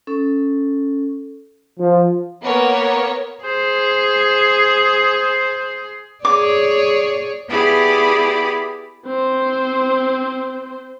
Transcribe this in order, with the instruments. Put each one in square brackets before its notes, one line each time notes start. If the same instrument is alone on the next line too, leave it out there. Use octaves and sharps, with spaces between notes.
[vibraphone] C#4 A4
[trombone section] F3
[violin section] A#3 B3 A#4 C#5
[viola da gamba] G#4 [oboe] C5
[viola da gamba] G#4 C#5 D5 [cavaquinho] D6
[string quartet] B3 E4 G4 G#4 D5 B5
[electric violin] C4 C5